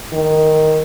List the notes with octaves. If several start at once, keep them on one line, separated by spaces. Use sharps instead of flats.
D#3